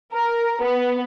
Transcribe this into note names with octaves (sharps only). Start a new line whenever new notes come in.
A#4
B3